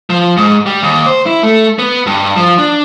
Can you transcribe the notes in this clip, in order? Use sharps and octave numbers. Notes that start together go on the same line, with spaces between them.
F3
G#2
G3
D#2
C5
E4
A3
B3
G2
F3
D4